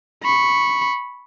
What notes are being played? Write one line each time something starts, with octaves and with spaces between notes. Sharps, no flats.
B5 C#6